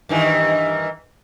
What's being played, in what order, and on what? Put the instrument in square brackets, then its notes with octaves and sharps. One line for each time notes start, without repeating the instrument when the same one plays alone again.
[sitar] G2 D#3 E3